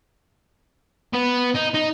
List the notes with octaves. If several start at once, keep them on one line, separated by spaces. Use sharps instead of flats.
B3
D#4
D#4